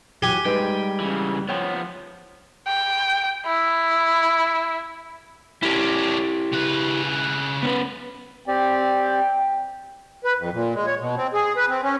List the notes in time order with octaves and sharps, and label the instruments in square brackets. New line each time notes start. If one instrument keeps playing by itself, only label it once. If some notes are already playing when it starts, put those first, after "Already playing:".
[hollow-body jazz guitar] E3 F#3 [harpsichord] G4 G#5
[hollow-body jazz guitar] G3 G#3 D#4 [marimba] B4 [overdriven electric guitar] G5
[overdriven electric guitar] C#3 E3
[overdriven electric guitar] F3 B3 [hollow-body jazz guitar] C#5 G5
[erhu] G5
E4
[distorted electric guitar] C#4 D4 [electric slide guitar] E4 G4
[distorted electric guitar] C#3 B4
[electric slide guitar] B3 C#4 B4
[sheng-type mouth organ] C4 G4 D5 [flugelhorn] G5
[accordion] B4
F2
A#2
G#3
C#5
B2
C4
G#4
B4
C4
C#4